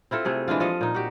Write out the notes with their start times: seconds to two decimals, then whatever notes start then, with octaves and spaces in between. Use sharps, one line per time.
0.11 C4 E4 F4 A4
0.25 C3 A3 G#4
0.48 E3 G#3 D4 F4
0.60 F3 A4 D#5 F5
0.81 A#2 D#4
0.94 F#4 G4